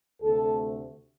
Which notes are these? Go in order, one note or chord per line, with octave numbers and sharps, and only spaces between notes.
D2 C3 A3 A4